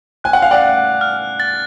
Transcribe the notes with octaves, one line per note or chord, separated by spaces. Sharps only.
G#5 F#6
F#5
F5
D5 F#5
F#6
F6
A6